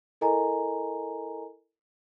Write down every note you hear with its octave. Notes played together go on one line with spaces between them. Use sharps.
E4 A4 A#4 D#5 G#5 A#5